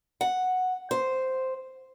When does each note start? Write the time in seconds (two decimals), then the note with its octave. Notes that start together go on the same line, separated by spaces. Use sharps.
0.21 F#5
0.91 C5